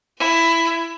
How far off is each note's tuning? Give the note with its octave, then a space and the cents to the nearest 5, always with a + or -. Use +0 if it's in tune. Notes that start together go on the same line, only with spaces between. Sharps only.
E4 +10